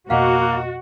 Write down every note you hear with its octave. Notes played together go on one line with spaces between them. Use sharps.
F2 B2 A#3 F#4 D#5 F5 F#5